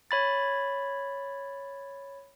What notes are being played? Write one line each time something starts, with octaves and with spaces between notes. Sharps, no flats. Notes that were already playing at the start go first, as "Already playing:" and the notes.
C#5 B5 A6